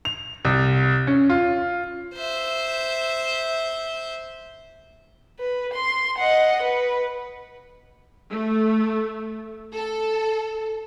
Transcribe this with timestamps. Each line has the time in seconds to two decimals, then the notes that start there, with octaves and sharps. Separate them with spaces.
0.05 F7
0.45 C2
1.07 C#4
1.30 F4
2.14 C5 E5
5.40 B4
5.73 C6
6.18 D#5 F#5
6.62 B4
8.30 A3
9.73 A4